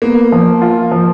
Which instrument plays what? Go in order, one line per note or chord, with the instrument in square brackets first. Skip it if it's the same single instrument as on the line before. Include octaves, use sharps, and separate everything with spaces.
[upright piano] A#3 [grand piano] B3
[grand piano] F3
F4
F3